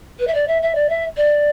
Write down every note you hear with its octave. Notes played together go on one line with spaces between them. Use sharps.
B4
E5
D5
E5
E5
D5
E5
D5